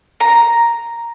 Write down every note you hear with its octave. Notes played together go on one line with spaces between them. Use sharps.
A#5